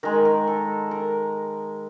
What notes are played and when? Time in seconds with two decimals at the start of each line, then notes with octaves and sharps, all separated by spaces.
0.03 D#3 G#3 A#4
0.25 A#4
0.47 A4
0.91 A#4